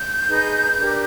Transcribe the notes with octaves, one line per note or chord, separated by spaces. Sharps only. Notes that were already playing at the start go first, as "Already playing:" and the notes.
Already playing: G6
D#4 G#4 B4
D4 G4 A#4